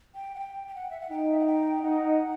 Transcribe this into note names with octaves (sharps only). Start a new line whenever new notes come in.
G5
F#5
G5
G5
F#5
E5
F#5
D#4 G5
E5
F#5
G5
D#4 F#5